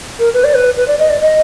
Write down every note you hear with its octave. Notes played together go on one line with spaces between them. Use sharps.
A#4
B4
D5
B4
B4
D5
D#5
D5
D#5